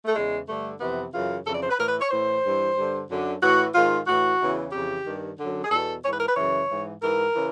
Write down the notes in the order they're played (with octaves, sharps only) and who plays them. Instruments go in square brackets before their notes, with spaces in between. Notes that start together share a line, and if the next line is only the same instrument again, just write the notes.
[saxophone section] A3
E2 C#3 E3 G#3
G2 D3 A3
F2 C3 E3 B3
F#2 C#3 E3 F4
F2 C#3 E3 A4
D5
C5
B4
A2 E3 A#4
B4
C#5
A2 E3 C5
G2 E3
G2 D3
F#2 D3
A2 E3 F#4
G#2 D#3 F4
A2 E3 F#4
E2 C#3 E3
F2 C#3 E3 G4
G2 D#3
F#2 D3
G#4
E2 B2 A4
G#2 E3 C#5
B4
A#4
B4
F#2 C#3 E3 C#5
G#2 E3
G#2 E3 A#4
C#3 E3